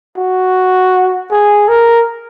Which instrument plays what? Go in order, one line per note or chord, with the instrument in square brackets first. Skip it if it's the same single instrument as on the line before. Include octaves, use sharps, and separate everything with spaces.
[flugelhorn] F#4
G#4
A#4